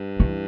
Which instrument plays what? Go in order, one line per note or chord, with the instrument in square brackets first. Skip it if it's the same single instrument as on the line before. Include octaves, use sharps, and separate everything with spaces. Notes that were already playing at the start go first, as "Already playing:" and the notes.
Already playing: [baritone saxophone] G2
[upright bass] E3